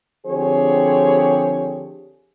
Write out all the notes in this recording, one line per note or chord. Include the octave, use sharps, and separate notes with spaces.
D3 F3 C4 G4 G#4 C#5